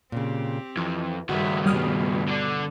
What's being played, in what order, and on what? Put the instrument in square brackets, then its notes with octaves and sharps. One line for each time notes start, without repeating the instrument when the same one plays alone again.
[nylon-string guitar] A#2 C#3 [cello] C4 G4
[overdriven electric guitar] F2 [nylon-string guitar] E3
[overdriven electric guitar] C#2 D#3 [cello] G2 E5 [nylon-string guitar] F#4
[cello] G2 B2 [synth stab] G3 D#6 F6
[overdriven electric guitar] D3 D4